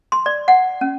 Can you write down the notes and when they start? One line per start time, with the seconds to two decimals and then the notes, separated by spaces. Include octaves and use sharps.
0.12 C6
0.26 D5
0.48 F#5
0.81 C#4